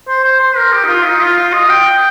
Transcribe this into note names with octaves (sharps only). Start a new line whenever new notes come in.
C5
C5
C5
A#4
G4
D#4
F4
D#4
F4
F4
D#5
G5